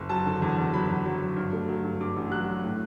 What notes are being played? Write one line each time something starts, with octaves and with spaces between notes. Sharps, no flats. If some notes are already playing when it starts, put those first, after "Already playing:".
Already playing: F#1
F#3 A5
D3
E2
E2
F#3 B5
E2
F#3
F#3
G2
A3
F#3
G2
G2 D6
A1
F#3 F#6
F#3
A2